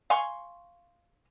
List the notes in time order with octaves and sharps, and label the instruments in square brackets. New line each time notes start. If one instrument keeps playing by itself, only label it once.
[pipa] F5 G#5 C6 C#6